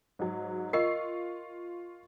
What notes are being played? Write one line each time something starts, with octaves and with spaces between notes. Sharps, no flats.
G#2 F#3
F4 A#4 D#5 C#6 C7